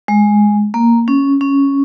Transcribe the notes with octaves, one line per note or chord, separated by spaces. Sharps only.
G#3
A#3
C#4
C#4